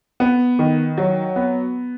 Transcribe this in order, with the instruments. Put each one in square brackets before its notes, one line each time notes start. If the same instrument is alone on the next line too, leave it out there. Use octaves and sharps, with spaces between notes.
[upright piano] B3
D#3
F#3
B3